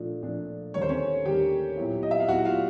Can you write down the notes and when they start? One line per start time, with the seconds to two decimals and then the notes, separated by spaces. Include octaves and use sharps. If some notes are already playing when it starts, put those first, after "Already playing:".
Already playing: A#2 F3 A3 D4
0.22 A#2 F3 A3 D4
0.74 D#2 D3 G3 A#3 C#5
0.82 C5
0.89 C#4 C#5
1.25 D#2 D3 G3 A#3 G4 G5
1.77 A#2 F#3 B3 E4
2.03 D#5
2.11 E5
2.20 F5
2.28 A#2 F#3 B3 E4 F#4 F#5
2.45 F4 F5